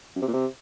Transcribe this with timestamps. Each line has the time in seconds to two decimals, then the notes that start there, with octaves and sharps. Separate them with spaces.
0.16 F#2
0.22 C3
0.28 A#2
0.34 C3